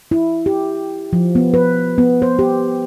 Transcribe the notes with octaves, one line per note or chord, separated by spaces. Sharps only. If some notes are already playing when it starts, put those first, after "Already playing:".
E4
G4
F3
B3
B4
B3
C5
G4